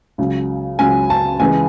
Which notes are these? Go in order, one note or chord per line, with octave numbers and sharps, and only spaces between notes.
C#2 C#3 F#3
C#2 C#3 F#3 G#5
A5
C#2 C#3 E3 G#3 G#5